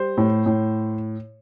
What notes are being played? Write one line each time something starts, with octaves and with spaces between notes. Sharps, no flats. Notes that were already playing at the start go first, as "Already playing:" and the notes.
Already playing: G3 C5
A2
A2